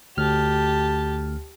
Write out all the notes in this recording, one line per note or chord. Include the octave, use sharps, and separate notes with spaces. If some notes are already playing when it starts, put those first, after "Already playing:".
D2 G4 A5 F6